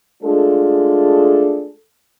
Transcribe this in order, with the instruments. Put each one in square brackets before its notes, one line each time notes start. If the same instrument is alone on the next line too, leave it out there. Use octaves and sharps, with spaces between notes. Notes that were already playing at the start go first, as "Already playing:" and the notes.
[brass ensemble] G#3 A3 D4 F4 G#4 A4